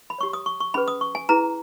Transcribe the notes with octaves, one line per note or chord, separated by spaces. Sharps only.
B5
G4 C#5 C#6
D#6
C#6
C#6
C#4 G#4 B4 B5
D#6
C#6
G#5
E4 G#4 B4 A#5